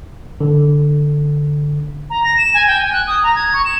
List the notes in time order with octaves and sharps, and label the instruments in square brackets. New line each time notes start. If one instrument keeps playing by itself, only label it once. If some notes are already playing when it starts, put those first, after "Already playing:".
[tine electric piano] D3
[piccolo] A#5
A#6
E7
G#5
G5
G#5
F#6
D#6
A#5
G#6
C#6
E7